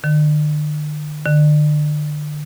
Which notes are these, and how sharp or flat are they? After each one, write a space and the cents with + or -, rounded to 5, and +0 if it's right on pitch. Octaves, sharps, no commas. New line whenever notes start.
D3 +45
D3 +30